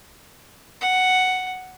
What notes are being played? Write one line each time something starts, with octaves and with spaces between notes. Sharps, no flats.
F#5